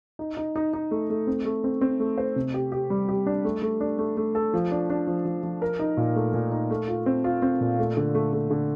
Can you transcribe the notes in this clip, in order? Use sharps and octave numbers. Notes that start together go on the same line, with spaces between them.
D#4
D#4
D#4
D#4
A3
A3
C4
A3
C4
C4
A3
C5
C3
G4
G4
G3
G4
D4
A3
A3
D4
A3
A3
A4
F3
D4
D4
F3
F3
F3
A#4
D#4
A#2
A3
A#2
D#4
A3
F4
C4
F4
C4
A#2
A3
D3
A3
A3
D3